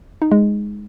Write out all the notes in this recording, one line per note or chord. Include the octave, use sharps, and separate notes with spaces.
D#4
G#3